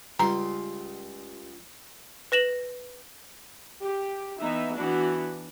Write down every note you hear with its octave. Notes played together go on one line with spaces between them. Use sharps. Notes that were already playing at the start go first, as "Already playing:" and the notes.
C#2 G3 A#5 C6
B4 A#6 E7 F#7
G4
E3 B3 D#4 E5
E3 B3 D4 F#4